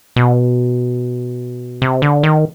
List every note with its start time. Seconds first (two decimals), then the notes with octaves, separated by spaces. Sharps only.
0.16 B2
1.82 C3
2.02 D3
2.23 D#3